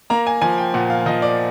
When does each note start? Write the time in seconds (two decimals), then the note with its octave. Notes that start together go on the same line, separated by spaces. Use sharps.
0.10 A#3 A#5
0.27 G#5
0.42 F3 G#5
0.58 G5
0.74 A#2 F#5
0.90 F5
1.06 F3 D#5
1.22 D5